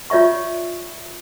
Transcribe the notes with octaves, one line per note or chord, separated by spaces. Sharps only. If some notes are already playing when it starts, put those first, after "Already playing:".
F4 C#5 D5 E5 C#6